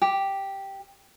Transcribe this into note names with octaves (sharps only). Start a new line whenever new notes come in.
G4